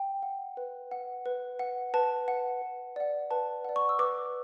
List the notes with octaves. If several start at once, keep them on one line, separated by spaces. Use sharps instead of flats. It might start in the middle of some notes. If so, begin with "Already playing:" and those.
Already playing: G5
F#5
B4
F#5
B4
F#5
B4 A5
F#5
B4
D5 F#5
B4 A5
D5 F#5
C#6
E6
B4 D6